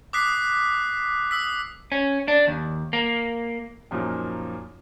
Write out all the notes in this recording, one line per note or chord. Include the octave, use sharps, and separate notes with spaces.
D6 D#6 F#6 B6 C7
D#6 E6 B6
C#4
D4
D#2
A#3
F#2 A#2 F3 A#3 D#4